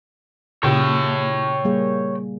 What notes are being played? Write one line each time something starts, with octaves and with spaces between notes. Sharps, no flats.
A#2 C#3 G4 C#5 G5
G3 A#3 G#4